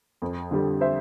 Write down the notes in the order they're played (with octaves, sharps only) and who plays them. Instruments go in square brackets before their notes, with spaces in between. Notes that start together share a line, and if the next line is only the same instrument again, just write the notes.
[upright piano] F2
D3 G3
C5 E5